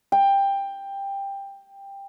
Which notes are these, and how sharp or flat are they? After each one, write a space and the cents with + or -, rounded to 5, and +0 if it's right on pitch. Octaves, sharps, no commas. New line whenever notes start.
G5 +15